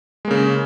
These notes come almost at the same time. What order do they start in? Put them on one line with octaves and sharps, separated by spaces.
G#3 A#3 C#3